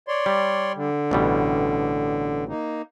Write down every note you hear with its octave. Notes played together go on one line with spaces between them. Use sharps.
C#5 D5 C6
G3
D3
A1 B2 G3
A#3 D#4